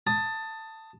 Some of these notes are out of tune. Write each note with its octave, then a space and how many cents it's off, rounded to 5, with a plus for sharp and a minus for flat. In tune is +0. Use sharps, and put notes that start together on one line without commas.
A5 +15 D#6 +0